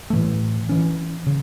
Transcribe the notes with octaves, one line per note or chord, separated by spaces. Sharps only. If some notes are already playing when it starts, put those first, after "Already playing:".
A2 E3 A3
E3 C#4
C#3